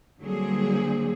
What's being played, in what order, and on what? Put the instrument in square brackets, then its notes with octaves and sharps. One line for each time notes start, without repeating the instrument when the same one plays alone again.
[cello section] D3 F#3 G3 A#3 C4 G#4